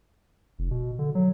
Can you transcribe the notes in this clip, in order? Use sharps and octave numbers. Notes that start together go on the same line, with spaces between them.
F1
B2
D3
F#3